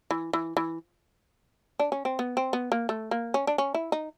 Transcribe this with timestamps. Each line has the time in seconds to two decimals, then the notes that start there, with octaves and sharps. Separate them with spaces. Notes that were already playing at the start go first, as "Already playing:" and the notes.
0.11 E3
0.33 E3
0.57 E3
1.79 D4
1.92 C#4
2.05 C4
2.19 B3
2.37 C4
2.53 B3
2.72 A#3
2.89 A3
3.11 A#3
3.34 C#4
3.47 D4
3.58 C#4
3.74 E4
3.92 D#4